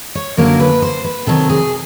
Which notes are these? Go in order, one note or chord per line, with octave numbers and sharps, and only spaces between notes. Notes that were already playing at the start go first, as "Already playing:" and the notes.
C#5
F#2 D3 F#3 A#3 C#4 A#4
B4
C5
B4
C3 D#3 F#3 B3 A4
G#4